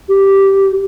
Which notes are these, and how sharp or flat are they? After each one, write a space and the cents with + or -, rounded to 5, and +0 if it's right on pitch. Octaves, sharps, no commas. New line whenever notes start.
G4 -5